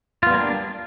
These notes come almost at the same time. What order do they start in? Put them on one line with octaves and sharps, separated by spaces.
F4 B3 G3 A#3 D4